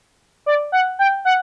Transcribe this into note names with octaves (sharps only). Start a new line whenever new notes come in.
D5
F#5
G5
F#5